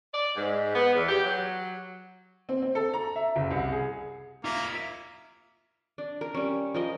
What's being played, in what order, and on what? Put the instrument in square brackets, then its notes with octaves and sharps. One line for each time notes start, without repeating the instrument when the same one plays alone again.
[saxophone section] D5
G#2
B3
E2
G4
F#3
[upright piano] C4
C4
A4
A#5
E5
F#1
C2
G#4
[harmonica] A#3 [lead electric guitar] F4 E5
[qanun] D4
A#4
G3 C#4
F3 A#4 D#5